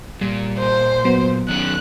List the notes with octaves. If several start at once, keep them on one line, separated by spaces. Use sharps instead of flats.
A#2 G3
C5
F#3 B3
D#3 C#4 F#6